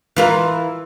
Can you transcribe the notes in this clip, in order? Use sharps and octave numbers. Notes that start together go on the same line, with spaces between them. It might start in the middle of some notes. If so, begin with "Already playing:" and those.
E3 F4 A#4